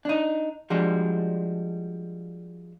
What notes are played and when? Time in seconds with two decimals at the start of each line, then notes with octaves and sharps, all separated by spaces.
0.05 D4 D#4
0.70 F3 G3 G#3 D4 F#4